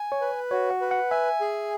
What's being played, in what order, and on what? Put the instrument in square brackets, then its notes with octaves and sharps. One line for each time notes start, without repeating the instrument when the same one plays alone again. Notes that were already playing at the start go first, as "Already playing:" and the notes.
Already playing: [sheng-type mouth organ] G#5
[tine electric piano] C#5
[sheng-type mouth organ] B4
[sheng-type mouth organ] F#4 [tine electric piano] C#5
[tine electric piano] F#5
[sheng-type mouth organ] B4
[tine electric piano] F#5
[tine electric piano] E5 [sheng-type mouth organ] G#5
[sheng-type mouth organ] G#4